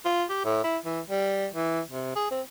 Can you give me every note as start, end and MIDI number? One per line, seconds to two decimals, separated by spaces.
0.05 0.25 65
0.30 0.44 67
0.45 0.60 45
0.64 0.78 64
0.85 1.00 52
1.10 1.47 55
1.54 1.80 52
1.90 2.12 48
2.16 2.27 68
2.31 2.41 60